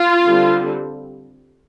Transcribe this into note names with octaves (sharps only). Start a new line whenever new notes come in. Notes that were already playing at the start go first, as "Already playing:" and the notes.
Already playing: F4
D3 G3 C4